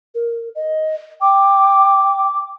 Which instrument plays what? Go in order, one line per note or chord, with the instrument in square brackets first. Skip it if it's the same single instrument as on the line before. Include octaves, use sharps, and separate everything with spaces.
[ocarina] A#4
D#5
[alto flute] G5 [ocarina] D6